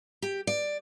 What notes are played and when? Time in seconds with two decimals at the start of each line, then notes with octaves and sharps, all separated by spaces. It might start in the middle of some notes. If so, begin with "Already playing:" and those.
0.22 G4
0.47 D5